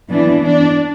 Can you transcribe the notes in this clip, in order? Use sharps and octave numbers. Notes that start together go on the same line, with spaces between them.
E3 B3 D4
D4